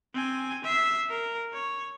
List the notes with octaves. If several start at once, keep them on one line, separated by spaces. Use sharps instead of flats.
C4 G#5
E5 C7
A#4
C#5